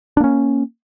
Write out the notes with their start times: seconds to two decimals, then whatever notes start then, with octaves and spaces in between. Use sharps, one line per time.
0.17 D4
0.20 A#3
0.24 C#4